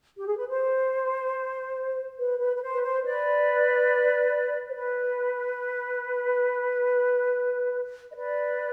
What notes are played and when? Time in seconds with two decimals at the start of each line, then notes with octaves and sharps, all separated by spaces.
0.16 G4
0.26 G#4
0.37 B4
0.48 C5
2.19 B4
2.39 B4
2.56 B4
2.62 C5
2.72 B4
2.82 C5
3.04 B4 D5
4.69 C5
4.74 B4
8.11 D#5
8.15 B4 D5